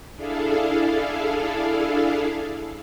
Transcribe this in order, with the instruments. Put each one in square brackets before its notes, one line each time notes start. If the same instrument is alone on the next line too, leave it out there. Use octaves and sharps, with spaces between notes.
[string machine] D4 E4 G#4 A4 F5